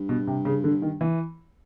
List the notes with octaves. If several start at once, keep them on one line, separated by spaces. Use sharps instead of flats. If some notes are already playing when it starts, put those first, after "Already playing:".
Already playing: G2
B2
C3
C#3
D3
D#3
E3